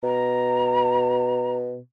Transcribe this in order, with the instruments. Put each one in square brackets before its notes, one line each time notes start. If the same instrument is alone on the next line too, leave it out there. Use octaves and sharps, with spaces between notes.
[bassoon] B2 [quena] A#5